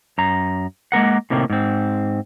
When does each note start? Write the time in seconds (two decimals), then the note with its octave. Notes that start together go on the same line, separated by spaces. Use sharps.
0.18 F#2 A#5
0.92 G#3 A#3 A#4 F#5
1.30 A2 C3 D#3 A#3
1.50 G#2 C4